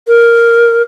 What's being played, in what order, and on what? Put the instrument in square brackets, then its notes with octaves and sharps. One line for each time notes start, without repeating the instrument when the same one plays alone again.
[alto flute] A#4